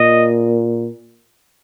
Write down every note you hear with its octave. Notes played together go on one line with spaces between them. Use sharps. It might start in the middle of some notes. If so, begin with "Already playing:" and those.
Already playing: A#2 D#5